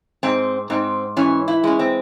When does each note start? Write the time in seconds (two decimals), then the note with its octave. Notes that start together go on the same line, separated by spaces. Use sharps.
0.23 G#2 C4
0.70 G#2 C4
1.17 E3 C#4
1.48 E4
1.64 G#3 C#4
1.79 C4